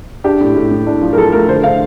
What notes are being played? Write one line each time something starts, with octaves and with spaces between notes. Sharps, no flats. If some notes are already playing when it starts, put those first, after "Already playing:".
D4 G4
A2
A2
A2
D4
F3
A#4
F3 A4
A3 A#4
D3 C5
D3 F5